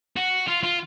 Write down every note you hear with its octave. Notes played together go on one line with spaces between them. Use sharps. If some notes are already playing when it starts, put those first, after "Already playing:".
F#4
F4
F4